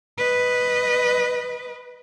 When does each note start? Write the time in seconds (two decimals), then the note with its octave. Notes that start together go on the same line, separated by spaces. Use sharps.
0.18 B4 D#5